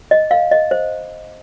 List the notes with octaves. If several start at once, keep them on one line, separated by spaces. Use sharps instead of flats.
D#5
F5
D#5
C5